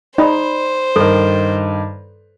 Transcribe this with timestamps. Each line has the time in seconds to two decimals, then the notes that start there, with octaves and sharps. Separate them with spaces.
0.18 D#4 C5 D5 B5
0.96 G2 D#3 A4